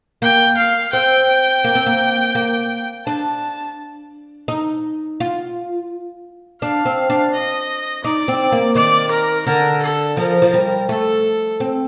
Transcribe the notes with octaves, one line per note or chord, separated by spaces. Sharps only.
A#3 G5
F5
C4 G5
A#3
C4
A#3
A#3
D4 A5
D#4
F4
D4 F5
C4
D4
D#5
D#4 D5
C4
A#3
D#3 D5
A#4
D3 A#4
A4
F3 A#4
F3
G3
A3 A4
C4